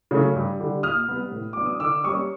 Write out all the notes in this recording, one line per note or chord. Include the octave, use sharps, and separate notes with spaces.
C#3 F#3 A3
G2
D3 G3
A#2 D#6 F6
G3 B3
A2
F#3 B3 D4 D6
D#6
D3 D6 E6
G3 A#3 C#4 C#6 D#6